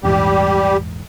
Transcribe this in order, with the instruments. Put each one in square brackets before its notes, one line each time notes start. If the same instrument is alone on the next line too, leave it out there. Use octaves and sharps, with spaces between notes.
[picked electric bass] A#1 E2 G#2 [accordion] G3 G4